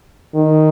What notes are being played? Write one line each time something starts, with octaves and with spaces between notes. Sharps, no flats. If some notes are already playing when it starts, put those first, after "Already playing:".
D#3